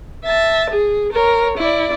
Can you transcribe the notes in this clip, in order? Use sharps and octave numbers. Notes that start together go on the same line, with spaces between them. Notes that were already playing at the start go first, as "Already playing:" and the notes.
E5 A5
G#4
A#4 C#5
E4 D5